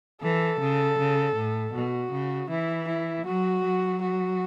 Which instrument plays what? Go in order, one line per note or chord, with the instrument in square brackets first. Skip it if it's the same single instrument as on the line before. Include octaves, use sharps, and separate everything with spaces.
[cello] E3 [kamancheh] A4
[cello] C#3
C#3
A2
[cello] B2 [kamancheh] F#4
[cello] C#3
[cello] E3 [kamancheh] E4
[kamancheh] E4
[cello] F#3 [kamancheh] F#4
[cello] F#3
[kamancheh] F#4